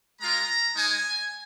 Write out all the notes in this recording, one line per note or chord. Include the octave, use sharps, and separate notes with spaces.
G#3 F4 A#5
G#3 D#4 G#5